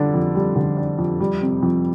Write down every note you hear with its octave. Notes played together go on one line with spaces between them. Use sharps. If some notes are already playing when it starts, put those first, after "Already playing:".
Already playing: D3 G3 D4
F2
G3
D3
D4
F2
G3
C3
F2